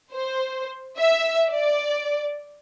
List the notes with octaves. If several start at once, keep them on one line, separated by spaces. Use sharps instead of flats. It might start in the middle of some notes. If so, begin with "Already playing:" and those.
C5
E5
D5